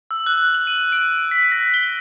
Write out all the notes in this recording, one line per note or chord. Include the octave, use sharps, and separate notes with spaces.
E6
F#6
F#7
D#7
D7
B6
A#6
G7